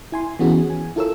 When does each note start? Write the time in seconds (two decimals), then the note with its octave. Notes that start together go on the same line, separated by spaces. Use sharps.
0.12 E4 G#5 C6
0.39 E3 B3 C#4 F#4 G#4
0.70 G#5
0.96 E4 F4 A4 A#4 C#5 E6